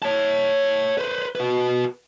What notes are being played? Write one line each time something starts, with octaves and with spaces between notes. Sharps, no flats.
C#5 A5
B4 C5
F#4 B4